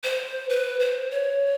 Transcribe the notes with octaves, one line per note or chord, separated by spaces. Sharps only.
C5
B4
C5
C#5